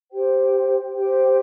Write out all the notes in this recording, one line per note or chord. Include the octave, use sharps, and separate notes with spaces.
G4 C5 G5
G4 C5 G5